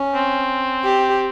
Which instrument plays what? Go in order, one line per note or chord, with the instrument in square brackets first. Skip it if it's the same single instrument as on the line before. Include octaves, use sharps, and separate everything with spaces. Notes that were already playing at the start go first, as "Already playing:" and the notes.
Already playing: [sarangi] C#4
[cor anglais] C4
[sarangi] G4